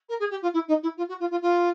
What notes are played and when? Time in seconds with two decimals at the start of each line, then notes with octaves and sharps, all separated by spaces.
0.09 A#4
0.19 G#4
0.30 G4
0.42 F4
0.53 E4
0.68 D#4
0.82 E4
0.97 F4
1.08 F#4
1.19 F4
1.30 F4
1.41 F4